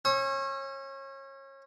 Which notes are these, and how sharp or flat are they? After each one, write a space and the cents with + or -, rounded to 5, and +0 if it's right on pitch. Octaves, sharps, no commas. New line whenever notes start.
C#4 -30 D#6 +45